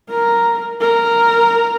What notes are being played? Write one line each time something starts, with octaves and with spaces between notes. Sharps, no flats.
A#4
A#4